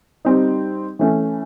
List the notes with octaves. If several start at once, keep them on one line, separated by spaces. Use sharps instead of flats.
G3 C4 D#4
E3 A3 C#4